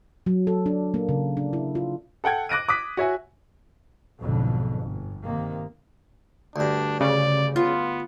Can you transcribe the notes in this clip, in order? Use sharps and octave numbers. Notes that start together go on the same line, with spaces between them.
F#3
A4
D4
A#3
C#3
D4
E4
F4
A4 F#5 G5 G#6
D6 F#6 A#6 D7 D#7
D6 D#6 F#6 B6
F#4 C#5 E5 G#5
B1 F2 G#2 B2 D3
G1
C3 D#3 A#3
D2 G2 D4
C#3 D5
B3 F4